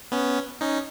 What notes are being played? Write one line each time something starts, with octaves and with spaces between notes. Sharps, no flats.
B3 C#4
C#4 D#4